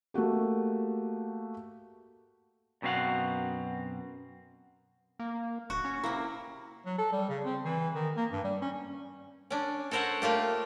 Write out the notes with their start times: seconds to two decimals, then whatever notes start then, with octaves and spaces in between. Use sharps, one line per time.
0.14 A3 A#3 F#4 G4
2.82 F#2 B2 C4 D4 F5 F#5
5.19 A#3
5.70 D1 F#4
5.85 C#4
6.04 C3 A#3 E4
6.86 F#3
6.98 A4
7.12 G3
7.29 C#3
7.44 C4
7.64 E3
7.94 D#3
8.17 A#3
8.31 G2
8.44 G3
8.62 C#4
9.50 C#4 D4
9.91 A4 A#4 C5 C#5 F#5
10.22 A3 A#3 F4 G4